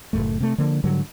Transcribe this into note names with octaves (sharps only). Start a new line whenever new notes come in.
F#1 F#2 A2 A3
C3 A3
D3 F3 A#3
G#2 D3 F#3 G3